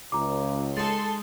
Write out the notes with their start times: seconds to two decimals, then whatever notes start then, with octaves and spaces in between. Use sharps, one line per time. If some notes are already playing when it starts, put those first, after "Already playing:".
0.12 C#2 A#5 D6
0.77 G#3 D#4 A4 C6 A6